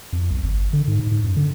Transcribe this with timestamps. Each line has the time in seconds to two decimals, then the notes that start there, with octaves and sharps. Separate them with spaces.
0.13 F2
0.31 B1
0.43 G1
0.57 G1
0.73 D3
0.88 G#2
0.99 G#2
1.12 G#2
1.24 F#2
1.37 D3